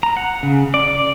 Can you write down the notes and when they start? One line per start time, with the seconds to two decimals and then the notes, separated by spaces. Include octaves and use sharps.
0.03 A#5
0.17 F#5
0.43 C#3
0.74 D5
0.88 D5